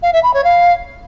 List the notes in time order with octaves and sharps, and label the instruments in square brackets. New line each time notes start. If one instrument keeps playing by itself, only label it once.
[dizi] F5
E5
B5
C#5
F5